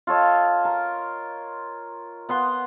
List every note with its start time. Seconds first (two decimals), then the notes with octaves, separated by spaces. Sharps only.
0.07 F4 A4 C#5 D#5
0.65 A#4
2.29 B3 F#5 C6